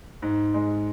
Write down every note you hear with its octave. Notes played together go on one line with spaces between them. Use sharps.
G#2
G#3